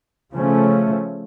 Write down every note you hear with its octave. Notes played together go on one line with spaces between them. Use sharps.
C#3 F3 A3 C#4